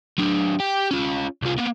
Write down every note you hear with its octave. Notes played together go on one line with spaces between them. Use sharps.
F#3 D4
G4 G5
C#4 F4
C2 F4
A#3 B3